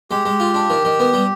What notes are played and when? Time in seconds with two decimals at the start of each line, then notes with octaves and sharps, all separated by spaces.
0.10 G#3 G4
0.25 G#3
0.40 F4
0.54 D4
0.70 D#3
0.85 D#3
1.00 B3
1.13 G3